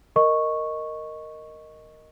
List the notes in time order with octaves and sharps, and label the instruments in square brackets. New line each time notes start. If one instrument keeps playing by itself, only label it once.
[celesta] A#4 D#5 C#6